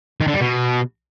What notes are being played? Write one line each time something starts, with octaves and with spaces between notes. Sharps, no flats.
D#3
D3
G3
B2